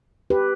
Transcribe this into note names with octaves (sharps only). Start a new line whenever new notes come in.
G4 B4